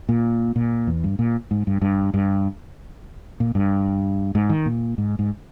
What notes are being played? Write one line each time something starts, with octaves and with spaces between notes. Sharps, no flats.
A#2
A#2
E2
G2
A#2
G#2
G2
G2
G2
A#2
G2
G#2
D#3
A#2
G#2
G#2